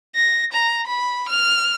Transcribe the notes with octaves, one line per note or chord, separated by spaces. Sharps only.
A#6
A#5
B5
F6